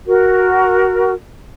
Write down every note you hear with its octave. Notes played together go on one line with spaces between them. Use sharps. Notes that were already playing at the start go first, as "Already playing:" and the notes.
F#4 A#4